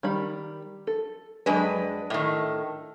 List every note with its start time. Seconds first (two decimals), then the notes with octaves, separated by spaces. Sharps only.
0.03 D#3 G3 B5
0.87 A4
1.46 F2 F#3 G#3 D4 B4
2.10 A2 D#3